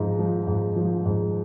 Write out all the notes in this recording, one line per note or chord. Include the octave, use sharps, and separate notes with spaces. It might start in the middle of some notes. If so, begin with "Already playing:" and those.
Already playing: G#2 F3 D#4
F3
G#2
F3
G#2